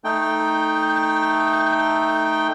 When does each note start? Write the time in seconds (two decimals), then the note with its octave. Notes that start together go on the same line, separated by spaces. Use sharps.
0.04 A3 D#4 G5